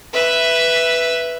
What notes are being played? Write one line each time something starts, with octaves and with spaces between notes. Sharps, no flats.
B4 E5